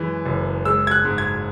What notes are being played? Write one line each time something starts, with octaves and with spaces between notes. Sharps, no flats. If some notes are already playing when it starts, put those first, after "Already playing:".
Already playing: F#2 E3 G#3
F#1
G#3 E6
G#6
F#6
G#2
G#6